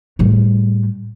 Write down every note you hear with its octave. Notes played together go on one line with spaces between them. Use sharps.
A2 G3